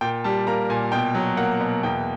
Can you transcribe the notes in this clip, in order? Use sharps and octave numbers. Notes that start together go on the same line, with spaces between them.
A#2 G5
G3 A5
A#3 A#5
A#2 G#5
B2 G5
F#3
A#3 F#5
B2
E2 G5